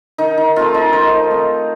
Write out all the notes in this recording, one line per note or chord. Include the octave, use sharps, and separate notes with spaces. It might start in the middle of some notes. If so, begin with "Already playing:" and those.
D#3 D#4
D#4
A3 C4 F4
D#4
D#3 C5
A3 C4